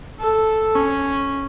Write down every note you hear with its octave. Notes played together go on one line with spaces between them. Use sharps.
A4
C#4